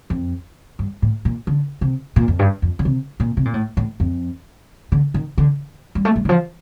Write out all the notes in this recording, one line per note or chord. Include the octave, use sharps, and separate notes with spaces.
F2
G2
A2
A#2
D3
C3
A#2
F2
G2
F2
D3
C3
A#2
C3
A#2
A2
A2
F2
D3
D#3
D3
G3
A3
G3
D#3
F3